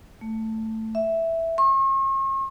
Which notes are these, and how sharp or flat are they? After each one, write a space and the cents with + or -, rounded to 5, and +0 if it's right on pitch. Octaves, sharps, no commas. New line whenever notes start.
A3 +10
E5 +0
C#6 -45